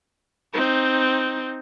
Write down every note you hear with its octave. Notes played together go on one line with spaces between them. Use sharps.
C4 D#4